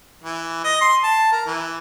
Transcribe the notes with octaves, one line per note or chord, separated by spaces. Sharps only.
E3
D#5
C6
A5
A#4
E3